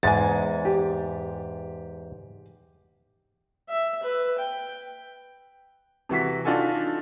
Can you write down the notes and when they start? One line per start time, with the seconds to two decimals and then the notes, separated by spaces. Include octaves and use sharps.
0.03 E2 G#2 G#3 G#5 A6
0.65 G4
3.69 E5
4.03 B4
4.38 G5
6.09 C3 E3 F#4 B6
6.45 D4 D#4 F4 F#4 A4 G#5